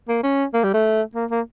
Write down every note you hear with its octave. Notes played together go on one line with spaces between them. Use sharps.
A#3
C#4
A#3
G3
A3
A#3
A#3